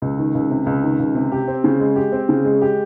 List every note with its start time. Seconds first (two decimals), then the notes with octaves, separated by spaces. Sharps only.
0.02 C#2
0.18 D#3
0.35 C#2
0.50 C3
0.66 C#2
0.83 D#3
0.99 C#2
1.15 C3
1.32 G4
1.48 C4
1.64 C#3
1.80 G#3
1.96 G4
2.12 C4
2.29 C#3
2.45 G#3
2.62 G4